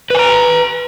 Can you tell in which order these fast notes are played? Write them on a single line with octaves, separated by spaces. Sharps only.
B4 G#5 A#5